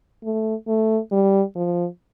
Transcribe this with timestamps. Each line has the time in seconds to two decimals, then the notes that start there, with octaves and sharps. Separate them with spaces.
0.24 A3
0.68 A3
1.12 G3
1.55 F3